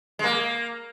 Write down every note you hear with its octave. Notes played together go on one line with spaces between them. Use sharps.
G#3
A#3